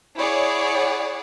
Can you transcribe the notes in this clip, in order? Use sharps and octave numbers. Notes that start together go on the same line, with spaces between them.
E4 G#4 C#5 D5 F#5